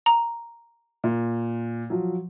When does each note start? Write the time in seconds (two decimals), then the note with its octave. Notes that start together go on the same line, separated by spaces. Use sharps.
0.06 A#5
1.04 A#2
1.90 F3 F#3